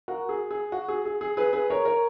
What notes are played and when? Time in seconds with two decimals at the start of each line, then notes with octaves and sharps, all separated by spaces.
0.08 F#4 A#4
0.29 G#4
0.51 G#4
0.72 F#4
0.88 G#4
1.05 G#4
1.21 G#4
1.37 G#4 B4
1.53 G#4 B4
1.70 A#4 C#5
1.85 A#4 C#5